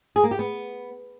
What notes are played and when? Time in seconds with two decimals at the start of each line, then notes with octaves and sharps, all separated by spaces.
0.16 G#4
0.24 A#3
0.31 G4
0.39 B3